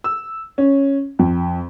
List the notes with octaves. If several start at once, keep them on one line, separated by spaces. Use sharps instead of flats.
E6
C#4
F2